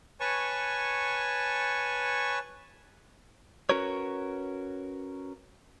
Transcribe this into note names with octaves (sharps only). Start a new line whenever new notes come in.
B4 C#5 G#5 A5 C#6
C#4 F#4 A#4 B4 C#5